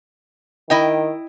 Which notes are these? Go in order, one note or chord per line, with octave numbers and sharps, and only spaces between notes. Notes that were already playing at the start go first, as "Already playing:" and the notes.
D#3 E4 D#5 G5